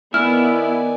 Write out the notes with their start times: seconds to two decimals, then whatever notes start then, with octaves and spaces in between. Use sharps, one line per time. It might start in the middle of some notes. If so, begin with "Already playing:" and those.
0.14 D#3 B3 E4 D5 G#5 F6